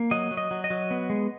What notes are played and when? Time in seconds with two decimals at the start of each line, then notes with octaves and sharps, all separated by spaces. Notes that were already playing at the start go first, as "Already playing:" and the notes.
Already playing: A#3
0.11 F#3 D#5
0.31 F#3
0.37 D#5
0.51 F#3
0.64 D#5
0.70 F#3
0.91 B3
1.10 G#3